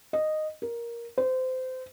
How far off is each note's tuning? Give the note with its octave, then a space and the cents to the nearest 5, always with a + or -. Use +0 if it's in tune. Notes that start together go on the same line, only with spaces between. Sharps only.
D#5 -10
A#4 +10
C5 -25